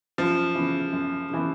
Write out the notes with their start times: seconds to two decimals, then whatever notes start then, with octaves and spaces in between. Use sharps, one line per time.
0.18 F#2 F3
0.55 C#3 E3
0.92 F#2
1.30 C#3 E3